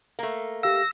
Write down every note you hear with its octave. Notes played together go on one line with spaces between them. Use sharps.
A3 A#3
G4 F5 E6 A#6